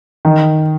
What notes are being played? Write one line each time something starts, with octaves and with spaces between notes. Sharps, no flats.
D#3